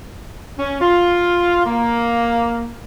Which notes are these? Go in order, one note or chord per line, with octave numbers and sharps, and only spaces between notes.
C#4
F4
A#3